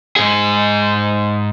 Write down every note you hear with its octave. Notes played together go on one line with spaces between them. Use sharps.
G#2 G#4